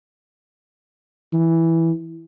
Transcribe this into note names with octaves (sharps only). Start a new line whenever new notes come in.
E3